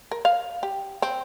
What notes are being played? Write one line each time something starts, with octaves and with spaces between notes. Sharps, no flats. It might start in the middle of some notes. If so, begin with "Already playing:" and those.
A#4
F5
G4
C4